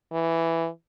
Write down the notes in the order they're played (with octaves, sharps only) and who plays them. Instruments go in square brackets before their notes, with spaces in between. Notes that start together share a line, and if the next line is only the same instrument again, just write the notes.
[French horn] E3